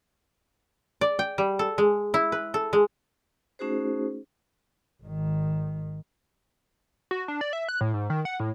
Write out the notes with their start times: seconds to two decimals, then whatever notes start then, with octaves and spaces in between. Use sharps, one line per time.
1.01 D5
1.19 G5
1.38 G3
1.59 A4
1.78 G#3
2.14 E4
2.32 B4
2.54 A4
2.73 G#3
3.59 A3 C#4 D#4 F#4 G#4 C5
5.02 G#1 D#3
7.11 F#4
7.28 D4
7.41 D5
7.53 E5
7.69 F#6
7.81 A2
7.94 G#2
8.10 D#3
8.25 F#5
8.40 A2